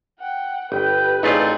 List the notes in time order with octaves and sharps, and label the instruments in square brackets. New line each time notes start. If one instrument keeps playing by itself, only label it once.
[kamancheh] F#5 G5
[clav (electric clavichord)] G1 [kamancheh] B4 [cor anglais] G5
[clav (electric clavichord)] A1 A3 F4 [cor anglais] C4 [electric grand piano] D#4 G#4 D5